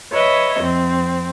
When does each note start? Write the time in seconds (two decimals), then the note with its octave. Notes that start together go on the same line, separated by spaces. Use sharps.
0.13 B4 C#5 D#5 E5
0.61 F2 C4